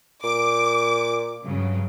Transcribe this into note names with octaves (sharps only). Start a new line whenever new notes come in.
A#2 D6
G2 C#3 F#3